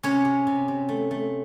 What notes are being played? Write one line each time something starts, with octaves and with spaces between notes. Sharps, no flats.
C3 C#4 C#5
C3
C3
C3
A3
A3